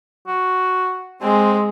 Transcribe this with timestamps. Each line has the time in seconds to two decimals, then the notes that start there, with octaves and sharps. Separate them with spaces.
0.27 F#4
1.22 G#3 C4